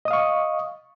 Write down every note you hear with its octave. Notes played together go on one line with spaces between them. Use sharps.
D#5 F5 C#6 D#6